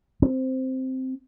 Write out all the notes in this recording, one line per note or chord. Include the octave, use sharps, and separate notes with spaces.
C4